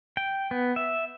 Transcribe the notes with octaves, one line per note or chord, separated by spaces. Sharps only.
G5
B3
E5